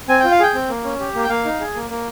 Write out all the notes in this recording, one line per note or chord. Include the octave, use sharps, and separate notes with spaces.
C4 G#5
F4 G5
F5
G#4 G5
C4
A#3
C#4
G4
A#3
G5
A#3 F5
D#4
G#4
A#3
A#3